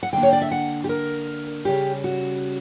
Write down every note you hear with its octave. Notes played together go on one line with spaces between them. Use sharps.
F#5
D3 A#3 D4 G5
C#5
D5
E5
F#5
G4
A#4
C#3 G3 C#4 G4
F#4